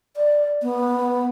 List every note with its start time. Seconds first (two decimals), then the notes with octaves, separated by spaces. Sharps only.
0.16 D5
0.62 B3